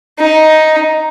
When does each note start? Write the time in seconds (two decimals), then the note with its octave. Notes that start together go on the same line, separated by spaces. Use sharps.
0.19 D#4